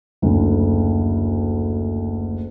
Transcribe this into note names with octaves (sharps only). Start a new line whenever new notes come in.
F#1 D2